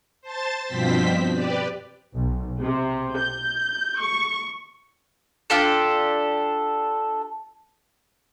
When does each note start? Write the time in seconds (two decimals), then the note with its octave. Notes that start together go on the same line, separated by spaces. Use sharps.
0.21 C5 A5 A6
0.67 G2 B2 F3 C4 C5 B6
1.31 G4 B4 D5
2.15 B1
2.61 C3
3.17 G6
4.00 C#6
5.50 D4 F4 G4 A4